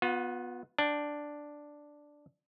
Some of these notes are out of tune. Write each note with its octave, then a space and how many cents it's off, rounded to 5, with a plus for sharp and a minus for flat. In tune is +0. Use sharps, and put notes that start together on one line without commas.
B3 +0 F4 +40
D4 +0 G5 -5